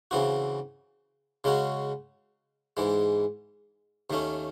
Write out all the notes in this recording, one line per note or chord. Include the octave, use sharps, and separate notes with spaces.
C#3 E3 C4 F#4
C#3 G#3 C#4 F#4
G#2 E3 G#3
D#2 D#3 A3 C#4